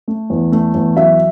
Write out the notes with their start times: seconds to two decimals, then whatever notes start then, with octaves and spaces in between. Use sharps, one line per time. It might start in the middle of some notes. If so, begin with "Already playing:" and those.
0.08 A3
0.30 E2
0.52 A3
0.74 E2
0.96 F#3 E5